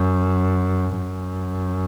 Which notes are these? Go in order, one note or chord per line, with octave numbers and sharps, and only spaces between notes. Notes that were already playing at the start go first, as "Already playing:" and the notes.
Already playing: F#2
F#2